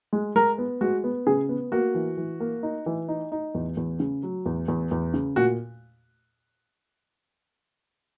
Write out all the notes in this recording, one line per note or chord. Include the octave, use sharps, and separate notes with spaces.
G#3
G#3 A#4
B3
G#3 F#4
B3
C#3 G#4
B3
A#3 F#4
E3
E3
A#3
D#4
E3
D#4
D#4
E2
E2
C#3
F#3
E2
E2
E2
C#3
A#2 F#4